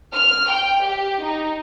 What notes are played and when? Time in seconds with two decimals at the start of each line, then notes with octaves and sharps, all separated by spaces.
0.14 F6
0.51 G5
0.84 G4
1.23 D#4